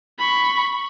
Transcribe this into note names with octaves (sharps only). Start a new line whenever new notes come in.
B5 C#6